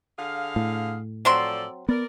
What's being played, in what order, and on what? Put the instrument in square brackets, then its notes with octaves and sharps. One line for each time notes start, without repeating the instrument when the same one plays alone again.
[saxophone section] D3 G#4 F5
[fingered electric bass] A2
[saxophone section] F3 A4 D5 [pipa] F#3 C4 C6
[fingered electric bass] B3 [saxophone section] A#4 D5